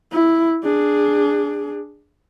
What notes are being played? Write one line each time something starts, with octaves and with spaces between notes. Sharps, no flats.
E4
D4 G#4